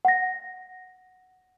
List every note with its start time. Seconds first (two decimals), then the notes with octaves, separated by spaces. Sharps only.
0.05 F#5 A#6